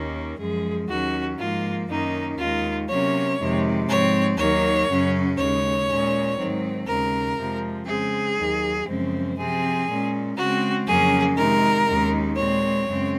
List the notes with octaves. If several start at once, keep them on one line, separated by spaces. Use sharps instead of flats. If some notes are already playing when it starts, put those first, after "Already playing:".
Already playing: D#2 D#3 A#3 C#4
F#2 F3 G#3 G#4
D#2 D#3 F#3 C#4 F#4
G#2 F3 A#3 F4
F#2 D#3 A#3 C#4 D#4
D#2 D#3 G#3 F4
C3 F#3 A#3 C#4 C#5
F2 C3 D#3 G#3
G#2 F3 C4 C#5
D#2 D#3 F#3 A#3 C#5
F#2 C#3 F#3 C#4
D#2 C#3 G#3 C#5
A#2 G#3 C#4
G#2 D#3 F#3 C4
D#2 C#3 G#3 A#4
F2 C3 F3 G#3
C#3 G#3 C4 G#4
D#2 D#3 F#3
F#2 C#3 F3 G#3 C4
C3 F3 C4 G#4
A#2 G#3 C#4
C#3 G#3 C4 F#4
F2 C#3 F#3 A#3 C#4 G#4
C3 D#3 G#3 A#4
D#2 D#3 G#3 C#4
A#2 G#3 C4 C#5
F#2 C#3 G#3 C4